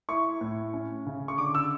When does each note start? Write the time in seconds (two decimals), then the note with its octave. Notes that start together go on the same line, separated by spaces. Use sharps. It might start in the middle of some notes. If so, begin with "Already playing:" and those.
0.09 E4 C#6
0.41 A2
0.74 C#4
1.06 C#3
1.28 C#6
1.38 D3 D6
1.55 E6